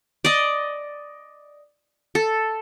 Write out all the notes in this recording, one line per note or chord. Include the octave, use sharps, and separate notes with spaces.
D5 D#5
A4